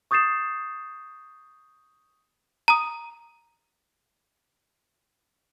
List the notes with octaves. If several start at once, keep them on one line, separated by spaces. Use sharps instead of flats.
C#6 D#6 G6 A6 C7 E7
A#5 D#6